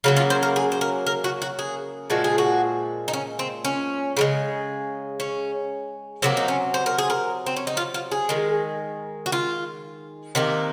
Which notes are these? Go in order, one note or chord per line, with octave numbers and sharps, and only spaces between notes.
C#3 F#3 A#3 F4
F4
C5
A#4
G#4
C5
A#4
A#4
F#4
F#4
G#4
A#2 F3 G#3 F#4
G#4
F#4
D#4
C#4
C4
C#4
C#3 F3 G#3
C#4
C3 F#3 A#3 C4
D#4
C#4
C5
A#4
G#4
A#4
C4
C#4
D#4
F4
F4
G#4
D#3 G#3
F#4
F4
C3 D#3 A#3